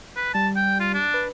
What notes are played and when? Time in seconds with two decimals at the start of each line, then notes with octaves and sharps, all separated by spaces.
0.16 B4
0.34 G3 A5
0.56 G5
0.80 F4
0.94 D4
1.14 B4